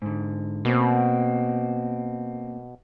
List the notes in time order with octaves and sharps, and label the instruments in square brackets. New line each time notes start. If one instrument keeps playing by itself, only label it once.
[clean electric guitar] G#2 D3
[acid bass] B2 [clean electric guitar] A#3 C4